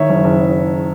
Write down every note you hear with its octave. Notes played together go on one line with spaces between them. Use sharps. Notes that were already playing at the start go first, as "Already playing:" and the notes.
Already playing: D#3 C#5 E5
F#1
F#1